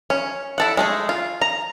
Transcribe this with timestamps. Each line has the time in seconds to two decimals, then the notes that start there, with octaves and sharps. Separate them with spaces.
0.10 C#4
0.58 E4 A4 F#5
0.77 G#3 A3 G#4
1.09 F4
1.42 A#5